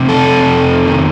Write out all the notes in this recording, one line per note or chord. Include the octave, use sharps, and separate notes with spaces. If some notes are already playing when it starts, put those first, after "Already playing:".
Already playing: F2 C3
A4
F2
D#3